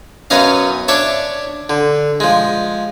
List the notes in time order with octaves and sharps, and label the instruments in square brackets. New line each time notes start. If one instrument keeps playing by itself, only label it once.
[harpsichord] F#2 B3 C#4 D#5 F5
D4 C#5 E5 A5
D3
F3 G#3